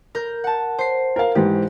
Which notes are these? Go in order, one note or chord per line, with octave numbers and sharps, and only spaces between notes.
A#4 G6
F#5 A5
C5 C7
A#4 F5
G#2 E3 G4